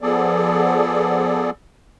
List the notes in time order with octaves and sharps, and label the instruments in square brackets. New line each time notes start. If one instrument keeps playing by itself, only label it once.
[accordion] F3 B3 G#4 A4 D5